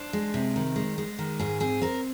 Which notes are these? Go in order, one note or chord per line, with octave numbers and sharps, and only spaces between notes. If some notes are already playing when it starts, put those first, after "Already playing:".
Already playing: D4 C5
G#3
C3
D#3
G#3
G#3
D#3
G#2 G#4
C4 G#4
C4 A#4